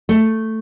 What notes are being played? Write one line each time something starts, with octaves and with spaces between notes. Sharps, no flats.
A3